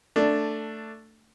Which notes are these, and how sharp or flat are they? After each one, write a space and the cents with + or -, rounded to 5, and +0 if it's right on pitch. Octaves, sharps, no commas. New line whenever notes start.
A3 +10 D4 +0